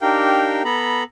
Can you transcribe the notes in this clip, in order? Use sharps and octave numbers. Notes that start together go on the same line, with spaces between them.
D4 D#4 G4 A#4 F5 G5
B3 A4 A#5 B5